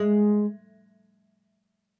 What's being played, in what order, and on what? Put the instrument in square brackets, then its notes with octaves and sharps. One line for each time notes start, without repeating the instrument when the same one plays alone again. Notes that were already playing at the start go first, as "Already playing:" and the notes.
Already playing: [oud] G#3